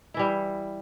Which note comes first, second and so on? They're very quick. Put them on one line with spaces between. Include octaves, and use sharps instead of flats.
E4 E3 G3